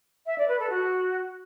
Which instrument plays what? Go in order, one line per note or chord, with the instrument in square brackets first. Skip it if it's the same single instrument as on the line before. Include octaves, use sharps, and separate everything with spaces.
[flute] E5
D5
B4
A4
F#4